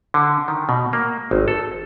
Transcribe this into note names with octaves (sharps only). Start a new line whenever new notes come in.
D3
D#3
B2
A#3
G#1
A4